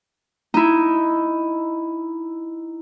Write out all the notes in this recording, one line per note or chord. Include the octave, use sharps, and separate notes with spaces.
D#4 E4